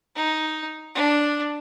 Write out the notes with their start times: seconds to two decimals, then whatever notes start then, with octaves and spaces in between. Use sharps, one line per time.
0.16 D#4
0.95 D4